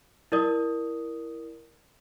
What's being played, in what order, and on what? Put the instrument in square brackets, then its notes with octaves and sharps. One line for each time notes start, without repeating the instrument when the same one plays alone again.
[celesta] E4 A#4 D5 D#6